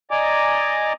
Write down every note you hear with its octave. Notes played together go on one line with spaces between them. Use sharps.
D5 D#5 G#5 A#5 D6